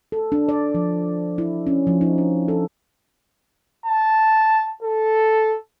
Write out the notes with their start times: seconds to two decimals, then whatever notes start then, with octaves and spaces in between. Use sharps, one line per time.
0.12 A4
0.32 D4
0.49 D5
0.74 F3
1.38 E4
1.67 C#4
1.87 F3
2.01 D#4
2.18 D4
2.48 A4
3.86 A5
4.83 A4